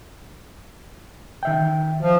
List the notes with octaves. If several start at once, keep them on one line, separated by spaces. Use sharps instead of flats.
D#3 E5 G5
F3